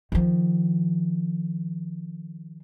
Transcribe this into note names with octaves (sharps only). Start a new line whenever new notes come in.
D#3 F3